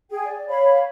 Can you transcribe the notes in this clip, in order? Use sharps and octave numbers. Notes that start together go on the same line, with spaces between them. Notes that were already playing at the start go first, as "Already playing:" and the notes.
G#4 G5
D5
C#5 F5 B5